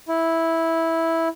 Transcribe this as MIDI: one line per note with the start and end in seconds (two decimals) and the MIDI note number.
0.08 1.28 64